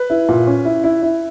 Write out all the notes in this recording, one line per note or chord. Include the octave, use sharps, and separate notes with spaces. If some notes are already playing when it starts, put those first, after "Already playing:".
Already playing: B4
E4
A#2
C#4
E4
E4
E4